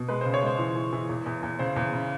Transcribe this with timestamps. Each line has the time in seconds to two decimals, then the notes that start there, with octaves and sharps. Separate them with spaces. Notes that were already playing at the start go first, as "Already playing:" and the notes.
Already playing: B2
0.08 G#3 B4
0.21 C#3 C5
0.34 C#5
0.43 G#3 C5
0.59 E3
0.75 E3
0.93 E3
1.09 E2
1.26 E2
1.43 E2
1.59 C#3 C5
1.76 E2
1.93 C#3